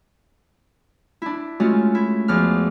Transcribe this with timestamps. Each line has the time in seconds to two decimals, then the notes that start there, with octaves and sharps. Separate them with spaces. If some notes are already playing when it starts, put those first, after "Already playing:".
1.22 D4 E4
1.60 G#3 A3 C#4 F4 F#4
1.95 E4
2.28 E2 F3 D6 F6